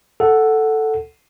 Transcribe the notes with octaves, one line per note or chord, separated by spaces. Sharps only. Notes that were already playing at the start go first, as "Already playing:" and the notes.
A4 F#5